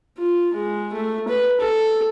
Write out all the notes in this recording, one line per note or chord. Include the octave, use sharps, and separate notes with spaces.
F4
G#3
A3
B4
A4